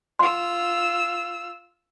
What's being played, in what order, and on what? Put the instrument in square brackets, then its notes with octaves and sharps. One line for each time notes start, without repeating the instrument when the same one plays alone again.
[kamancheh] F4 E6 [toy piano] C6